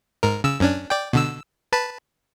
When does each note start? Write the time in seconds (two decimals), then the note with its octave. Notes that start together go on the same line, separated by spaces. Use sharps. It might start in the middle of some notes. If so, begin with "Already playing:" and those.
0.23 G#2 A#4
0.44 C#3 E6
0.60 F#2 C#4 D4
0.90 D5 G5
1.13 B2 D3 E6
1.72 B4 A5 B5